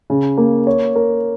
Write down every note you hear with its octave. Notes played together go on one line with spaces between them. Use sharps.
C#3
A#3
C#5
A#4